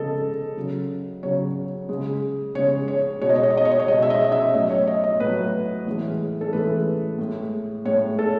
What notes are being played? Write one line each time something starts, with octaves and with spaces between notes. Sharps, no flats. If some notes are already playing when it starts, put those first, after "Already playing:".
Already playing: C#3 G#3 A4 D#5
C#3 F#3
C#3 F#3 C#5
C#3 G#3
C#3 G#3 C#5
C#5
B2 G#3 C#5
D#5
C#5
D#5
C#5
D#5
C#5
D#5
C#5
B2 G#3 D#5
E5
D#5
D#5
E5
A2 F#3 D#5
C#5
D#5
D#5
A2 F#3 B4
A2 E3 G#3
A4
A2 E3 G#3 B4
A2 G#3
A2 G#3 C#5
A4